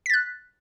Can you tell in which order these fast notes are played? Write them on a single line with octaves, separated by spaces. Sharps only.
B6 A6 F#6